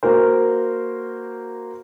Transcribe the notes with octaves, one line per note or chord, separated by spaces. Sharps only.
A#3 F#4 A#4 C5